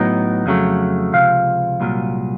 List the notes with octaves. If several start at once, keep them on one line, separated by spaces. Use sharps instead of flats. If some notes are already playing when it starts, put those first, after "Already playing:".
Already playing: A2 F#3 B3 D#4
F2 C#3 F#3 A3
C#2 C3 F3 F5
C2 A#2 F#3